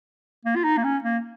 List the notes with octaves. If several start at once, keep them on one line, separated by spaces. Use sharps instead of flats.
A#3
F4
D#4
A#3
C#4
A#3